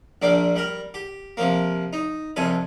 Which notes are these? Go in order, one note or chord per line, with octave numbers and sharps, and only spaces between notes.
A#1 A#2 A#3 D4 G5 D6
G3 A#4
G4
C3 F3 A#3
D#4
C2 F2 C3 A4 G#5